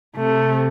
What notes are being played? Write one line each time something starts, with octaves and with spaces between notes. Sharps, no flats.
C3 A3